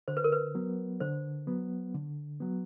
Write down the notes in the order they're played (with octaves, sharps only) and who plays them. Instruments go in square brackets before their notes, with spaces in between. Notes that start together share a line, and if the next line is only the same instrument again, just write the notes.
[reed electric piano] D3 [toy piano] C5
[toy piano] B4
A#4
B4
[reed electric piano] F#3 B3
[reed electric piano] D3 [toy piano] C5
[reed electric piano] F#3 B3
D3
F#3 B3